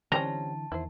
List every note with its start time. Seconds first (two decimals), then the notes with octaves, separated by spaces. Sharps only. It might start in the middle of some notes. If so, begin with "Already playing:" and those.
0.12 D3 E3 G3 C4 C#4 A5 A#5
0.72 E2 D#3 E4 C5